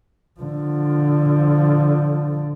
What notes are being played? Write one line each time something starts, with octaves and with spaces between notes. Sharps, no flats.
D3 F3